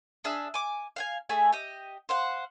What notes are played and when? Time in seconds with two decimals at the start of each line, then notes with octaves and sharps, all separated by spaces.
0.24 D4 G#4 E5 F6
0.54 G#5 D6
0.96 F5 F#5 G#5
1.29 A3 G#4 E5 G#5
1.52 G4 D#5
2.09 C5 F5 F#5